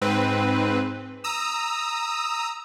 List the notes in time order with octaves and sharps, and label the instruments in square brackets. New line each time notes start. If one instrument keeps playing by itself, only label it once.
[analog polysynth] G#2 C4 B4
A#5 D#6 E6